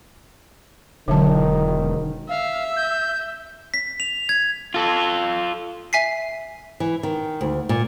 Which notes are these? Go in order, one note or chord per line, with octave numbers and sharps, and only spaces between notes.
E1 D3 D#3 F#3 A5
E5 F5
G6
B6
F7
G#6
F4 A4
E5 G#5 B6 C7
E3
D#3
D2
A#2